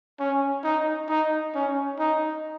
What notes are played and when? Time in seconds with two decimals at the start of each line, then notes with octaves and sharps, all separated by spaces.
0.20 C#4
0.64 D#4
1.09 D#4
1.55 C#4
1.99 D#4